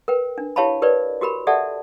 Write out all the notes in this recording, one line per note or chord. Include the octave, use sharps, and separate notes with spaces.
A#4 B4 G5
D4
E4 G4 C#5 F5 A5 B5
G4 A#4 B4 C#5 D5
F#4 G4 A#4 B5
G4 A4 D5 E5 F#5 A5